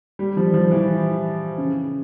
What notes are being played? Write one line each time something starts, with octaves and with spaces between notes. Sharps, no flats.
G3
F3
F3
E3
C#3